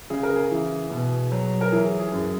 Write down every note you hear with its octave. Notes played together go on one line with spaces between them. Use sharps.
C#3 G#4
A#4
G#4
E3
B2
F#3
A#4
E3 G#4
G#4
F#2